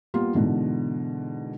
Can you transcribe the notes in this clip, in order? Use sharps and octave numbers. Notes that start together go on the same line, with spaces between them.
G3 A#3 B3 F4
G#2 B2 D3 E3